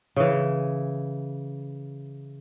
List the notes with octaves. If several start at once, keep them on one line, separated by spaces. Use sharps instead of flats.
C#3 E3